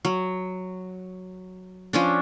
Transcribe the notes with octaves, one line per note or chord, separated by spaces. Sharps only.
F#3
F3 C#4 D4